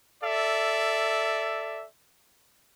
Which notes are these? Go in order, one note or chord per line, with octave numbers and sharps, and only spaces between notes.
A4 D5 E5